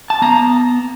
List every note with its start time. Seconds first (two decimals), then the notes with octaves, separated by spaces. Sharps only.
0.10 A5
0.22 B3 A#5